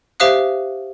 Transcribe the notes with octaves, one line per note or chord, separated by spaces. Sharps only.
G4 C5 E5 F5 D#6 F#6